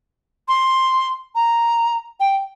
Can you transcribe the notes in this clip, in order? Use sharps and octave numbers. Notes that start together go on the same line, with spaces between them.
C6
A#5
G5